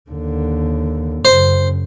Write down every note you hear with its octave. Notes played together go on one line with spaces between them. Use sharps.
D#2 D3
F#2 C#3 C5